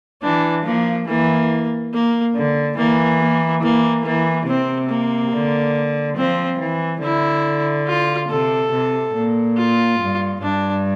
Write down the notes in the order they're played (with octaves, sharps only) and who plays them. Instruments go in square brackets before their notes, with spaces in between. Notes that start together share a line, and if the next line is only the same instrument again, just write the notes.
[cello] E3 [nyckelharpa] D4
[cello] F3 [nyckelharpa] A#3
[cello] E3 [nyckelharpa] A#3
[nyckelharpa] A#3
[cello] D3
[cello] E3 [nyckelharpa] A#3
[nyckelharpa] A#3
[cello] E3 [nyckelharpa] A#3
[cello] E3 [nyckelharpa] A#3
[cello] C3 [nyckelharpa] C4
[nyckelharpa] A#3
[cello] D3
[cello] F3 [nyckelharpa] C4
[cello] E3
[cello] D3 [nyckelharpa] E4
[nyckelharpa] F4
[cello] C3 [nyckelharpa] A4
[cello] C3
A#2
[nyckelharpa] F4
[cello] G2
[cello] G2 [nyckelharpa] D4